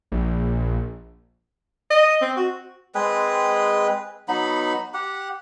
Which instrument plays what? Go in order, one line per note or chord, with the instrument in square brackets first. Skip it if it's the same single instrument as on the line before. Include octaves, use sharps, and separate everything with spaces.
[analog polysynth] A#1
[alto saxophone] D#5
C4
F#4
[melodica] G#3 C4 G#4 B4
F#3 B3 D#4 B5
G4 F#5